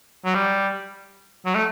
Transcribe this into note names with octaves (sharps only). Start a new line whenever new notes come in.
F#3
G3
F#3
A3